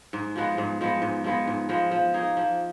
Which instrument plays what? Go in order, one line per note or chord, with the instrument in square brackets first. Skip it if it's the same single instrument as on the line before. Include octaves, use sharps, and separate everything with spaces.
[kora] G#2
F3 G#3 B3
G#2
F3 G#3 B3
G#2
F3 G#3 B3
G#2
F3 G#3 B3
F3
A#3 D#4 G#4
F3